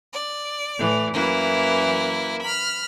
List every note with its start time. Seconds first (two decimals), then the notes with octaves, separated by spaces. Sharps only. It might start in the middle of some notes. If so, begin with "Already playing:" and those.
0.13 D5
0.78 A2 E3
1.13 F#2 E3 A#3 E4
2.42 B5 F6